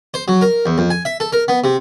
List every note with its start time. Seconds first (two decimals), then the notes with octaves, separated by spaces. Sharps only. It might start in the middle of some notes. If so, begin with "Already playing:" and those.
0.14 C5
0.28 F#3
0.41 A#4
0.66 E2
0.78 F2
0.90 G#5
1.05 E5
1.20 A4
1.33 A#4
1.48 B3
1.64 C3